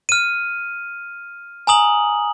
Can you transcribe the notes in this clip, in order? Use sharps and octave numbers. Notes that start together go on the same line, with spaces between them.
F6 D#7
G#5 A#5 D#6 F#7